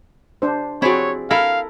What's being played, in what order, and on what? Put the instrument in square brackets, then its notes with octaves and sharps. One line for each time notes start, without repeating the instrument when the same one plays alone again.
[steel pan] D4 C5
[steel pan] C4 F#4 [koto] E4 G#4 D5 [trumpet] C#5
[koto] E4 A4 A#4 [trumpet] F5